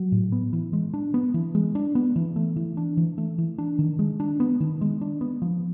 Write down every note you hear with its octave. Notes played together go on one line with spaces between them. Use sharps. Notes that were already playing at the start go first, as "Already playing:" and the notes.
Already playing: F#3
A2
B3
E3
G#3
D4
B3
E3
G#3
D4
B3
E3
A3
E3
D4
E3
A3
E3
D4
D#3
G#3
D4
B3
D#3
G#3
D4
B3
F3